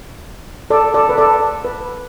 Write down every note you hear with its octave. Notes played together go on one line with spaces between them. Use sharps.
A4 D5
A4 D5
B4
A4 D5
B4